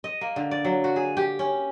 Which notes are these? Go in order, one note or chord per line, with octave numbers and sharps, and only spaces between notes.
D#5
A#3
D3
D5
F#3
F#4
G#4
G4
C#4